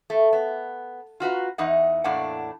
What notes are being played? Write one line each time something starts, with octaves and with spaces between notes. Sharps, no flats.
A3
B3
F4 F#4 B4 A#5
E2 E3 D#4 F#5
E2 A2 A#3 D4 F#5